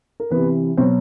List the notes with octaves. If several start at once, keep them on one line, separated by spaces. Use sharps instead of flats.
A#4
C3 E3 B3 B4
B2 F#3 C4 C5